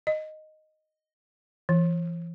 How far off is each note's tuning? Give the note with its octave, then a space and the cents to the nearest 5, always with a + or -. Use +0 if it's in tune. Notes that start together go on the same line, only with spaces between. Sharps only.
D#5 -5
E3 +35